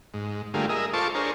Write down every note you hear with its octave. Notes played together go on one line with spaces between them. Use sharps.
G#2
D3 G3 A3 A#3 F4 G#4
G#4 A#4 D#5 E5
F4 A4 C5 A5 C#6 D6
D4 G#4 A#4 C5 C#5